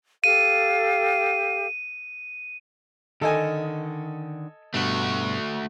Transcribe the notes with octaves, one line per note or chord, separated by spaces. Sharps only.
G4 A4 F5 D#7
D3 D#3 A4 D#5 G#5
G2 B2 A3 F#4